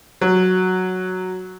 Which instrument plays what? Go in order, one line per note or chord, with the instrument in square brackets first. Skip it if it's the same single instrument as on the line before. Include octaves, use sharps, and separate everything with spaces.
[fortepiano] F#3